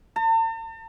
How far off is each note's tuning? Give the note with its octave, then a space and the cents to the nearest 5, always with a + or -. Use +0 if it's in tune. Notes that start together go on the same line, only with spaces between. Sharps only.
A5 +45